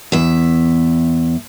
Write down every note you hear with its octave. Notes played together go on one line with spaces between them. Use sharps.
E2 E5